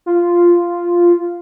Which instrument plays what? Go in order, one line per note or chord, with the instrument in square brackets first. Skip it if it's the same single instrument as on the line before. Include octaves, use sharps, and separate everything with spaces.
[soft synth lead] F4